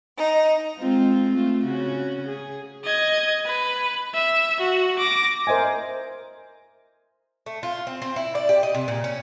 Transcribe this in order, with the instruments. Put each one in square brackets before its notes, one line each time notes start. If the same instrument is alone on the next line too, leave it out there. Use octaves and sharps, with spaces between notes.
[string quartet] D#4
[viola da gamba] G#3 C4 F4
A3 F4
C#3 C#4 F#4
G#4
[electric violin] D#5 G#6
B4
E5
F#4
D6 A#6
[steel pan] A#4 C5 D#5 E5 G#5
[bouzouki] A3
F4
C4
C4
E4
D5
G4
D#5
C3
A#2
C#4